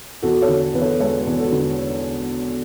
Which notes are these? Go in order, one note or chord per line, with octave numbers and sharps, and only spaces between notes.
E2 F#4 A4
A4 C#5
D3
E2 B4
A4 C#5
G#3 A4 C#5
E2
F#4 A4
D3